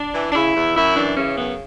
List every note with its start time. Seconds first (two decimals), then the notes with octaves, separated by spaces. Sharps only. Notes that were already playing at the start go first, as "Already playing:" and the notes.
Already playing: D4
0.14 E3
0.31 D4
0.35 C#3 E4
0.55 E2
0.76 F#2 E4
0.96 E3 D4
1.17 C#3 C#4
1.38 F#2 B3